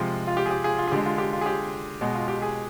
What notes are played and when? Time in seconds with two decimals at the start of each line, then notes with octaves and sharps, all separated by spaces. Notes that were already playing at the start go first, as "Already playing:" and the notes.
Already playing: C3 F3 G#3 F4
0.27 F4
0.37 G4
0.46 G#4
0.51 G4
0.64 F4 G#4
0.78 F4
0.87 G#4
0.92 D3 G#3 G4
1.05 F4
1.18 G4
1.33 F4
1.41 G#4
1.46 G4
2.01 B2 G#3
2.15 F4
2.28 G4
2.42 G#4